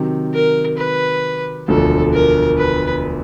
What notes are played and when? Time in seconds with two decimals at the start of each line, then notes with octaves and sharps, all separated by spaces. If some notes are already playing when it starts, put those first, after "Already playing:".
Already playing: C3 D#3 F#3
0.34 A#4
0.78 B4
1.68 E1 D2 D3 F3 A4
2.13 A#4
2.58 B4